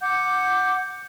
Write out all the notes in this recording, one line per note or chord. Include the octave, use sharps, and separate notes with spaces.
F#5 D6 G6